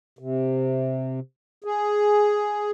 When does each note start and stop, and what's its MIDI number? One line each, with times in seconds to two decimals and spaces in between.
0.19 1.20 48
1.64 2.71 68